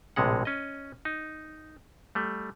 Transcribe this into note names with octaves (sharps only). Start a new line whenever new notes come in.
A#1 A2 C3 G#3 F#5
C#4 D#5
D#4
G3 A3